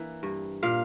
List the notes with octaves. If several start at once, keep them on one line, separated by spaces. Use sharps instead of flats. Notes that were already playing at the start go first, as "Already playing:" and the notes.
Already playing: E3 A#3 D4
G2
A#2 F5